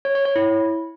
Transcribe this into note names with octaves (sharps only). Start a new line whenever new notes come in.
C#5
C#5
C#5
E4